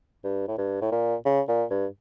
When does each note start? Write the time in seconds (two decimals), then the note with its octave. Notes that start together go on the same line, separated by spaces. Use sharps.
0.24 G2
0.48 A2
0.58 G2
0.81 A2
0.92 A#2
1.25 C#3
1.48 A#2
1.70 G2